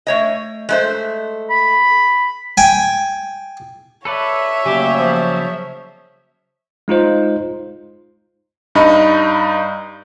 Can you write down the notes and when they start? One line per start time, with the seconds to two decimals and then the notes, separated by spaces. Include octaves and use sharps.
0.07 A3 C#5 D#5
0.69 G#3 A3 C5
1.50 B5
2.57 G5 G#5
4.05 A4 B4 C#5 D5 E5
4.66 C#3 F#3 G3 A3 A#3 G4 G#5
4.98 F3
6.88 G#3 D#4 F4 C5
8.75 G2 D#4 D#5 B5